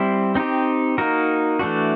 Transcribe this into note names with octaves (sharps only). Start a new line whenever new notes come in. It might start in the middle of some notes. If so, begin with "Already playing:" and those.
Already playing: G3 C4 E4
C4 D#4 G4
A#3 D#4 F#4 A#4
E3 A3 D4 F#4